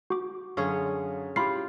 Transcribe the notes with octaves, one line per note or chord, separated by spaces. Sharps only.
F#4 D6
F#2 D3 C#4 G#4 C#5 F5
E4 F4 G4 B5 C7